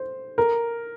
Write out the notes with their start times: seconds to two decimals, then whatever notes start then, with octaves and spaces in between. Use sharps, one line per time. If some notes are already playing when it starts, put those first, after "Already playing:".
Already playing: C5
0.38 A#4